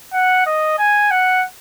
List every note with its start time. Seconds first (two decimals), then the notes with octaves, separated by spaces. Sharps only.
0.13 F#5
0.46 D#5
0.78 G#5
1.11 F#5